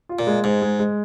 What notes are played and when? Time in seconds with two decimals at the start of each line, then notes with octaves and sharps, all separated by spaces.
0.09 F4
0.19 A#2
0.27 G#3
0.44 G#2 G#3
0.62 G#3
0.79 G#3